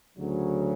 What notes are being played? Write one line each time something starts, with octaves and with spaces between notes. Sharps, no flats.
D2 C#3 F#3